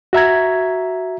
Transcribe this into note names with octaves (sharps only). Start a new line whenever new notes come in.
F#4 E5 A#5 G#6